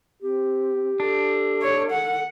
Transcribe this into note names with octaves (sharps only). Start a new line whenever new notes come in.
C4 G4
D4 A4
C#5
F#5